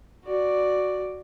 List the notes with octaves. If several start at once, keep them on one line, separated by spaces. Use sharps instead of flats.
F#4 D5